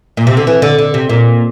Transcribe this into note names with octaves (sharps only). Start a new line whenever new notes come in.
A#2
C3
D3
E3
D3
D3
C3
A#2